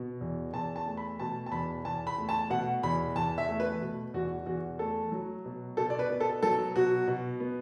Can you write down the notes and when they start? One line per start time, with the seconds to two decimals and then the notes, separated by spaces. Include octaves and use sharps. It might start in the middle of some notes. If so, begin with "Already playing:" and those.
Already playing: B2
0.21 E2
0.54 E2 A5
0.76 A5
0.86 A3
0.97 B5
1.20 B2 A5
1.46 A5
1.52 E2 B5
1.85 E2 A5
2.07 B5
2.18 A3
2.29 A5
2.50 B2 F#5
2.83 E2 B5
3.15 E2 A5
3.38 E5
3.49 A3
3.60 B4
3.81 B2
4.14 E2 F#4
4.46 E2 F#4
4.79 A3 A4
5.12 F#3
5.45 B2
5.77 B2 A4
5.90 D5
5.99 B4
6.10 B3
6.20 A4
6.43 F#3 A4
6.75 B2 F#4
7.08 B2
7.40 B3